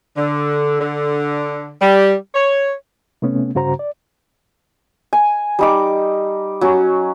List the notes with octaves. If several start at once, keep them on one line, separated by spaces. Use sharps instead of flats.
D3
D3
G3
C#5
C3 A3 B3 C#4
G2 C#3 F#4 C5 A#5
D5
G#5
G3 D#4 D6
F#3 C#4